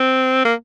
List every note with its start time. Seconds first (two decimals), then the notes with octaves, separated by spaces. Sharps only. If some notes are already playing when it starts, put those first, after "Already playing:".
Already playing: C4
0.45 A#3